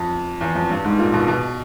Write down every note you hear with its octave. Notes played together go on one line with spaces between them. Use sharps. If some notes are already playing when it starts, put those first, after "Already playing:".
Already playing: F2
E2
F2
G2
G#2
A#2
B2
B2